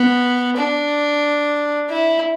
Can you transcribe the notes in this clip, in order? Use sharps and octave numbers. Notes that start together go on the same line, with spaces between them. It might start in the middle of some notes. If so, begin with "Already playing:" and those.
Already playing: B3
D4
E4